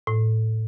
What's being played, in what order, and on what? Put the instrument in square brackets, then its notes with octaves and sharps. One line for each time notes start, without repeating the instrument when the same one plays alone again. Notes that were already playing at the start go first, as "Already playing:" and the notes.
[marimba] A2